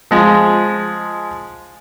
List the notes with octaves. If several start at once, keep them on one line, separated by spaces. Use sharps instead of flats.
F3 G#3